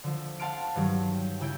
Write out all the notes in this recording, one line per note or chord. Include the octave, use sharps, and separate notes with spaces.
D3 F3
F5 F#5 A5 C6 F6 D7
G2 D#3 F#3
G5
C#3 E4 G5 D7